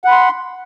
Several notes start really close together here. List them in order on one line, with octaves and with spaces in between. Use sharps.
F#5 B5 C6